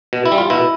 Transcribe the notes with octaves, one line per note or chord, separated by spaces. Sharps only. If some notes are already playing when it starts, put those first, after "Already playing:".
B2
E4
G3
F4
B2 E4